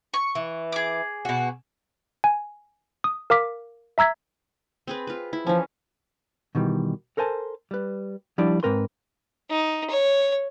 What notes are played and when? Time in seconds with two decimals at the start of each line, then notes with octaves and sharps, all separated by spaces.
0.14 C#6
0.35 E3
0.72 G#4 D6
1.25 B2 F#4
2.24 G#5
3.04 D#6
3.30 A#4 F5 D6 B6
3.98 E5 A#5 E6 G#6 B6
4.87 C4 G#4 B4
5.07 F4 B4
5.33 E4
5.47 E3 F3 C#4
6.55 B2 D#3 E3 G3
7.17 A4 A#4 C5 G#5 A5
7.71 G3 B4
8.38 F3 G3 D4 E4 D5
8.63 G#2 F3 C4 A#4 B4 C6
9.50 D#4
9.90 C#5